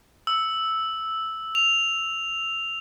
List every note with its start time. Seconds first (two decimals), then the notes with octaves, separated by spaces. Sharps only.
0.27 E6
1.55 F7